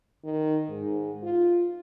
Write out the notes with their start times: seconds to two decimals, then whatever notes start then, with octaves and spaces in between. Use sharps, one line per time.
0.24 D#3
0.69 G#2
1.23 F4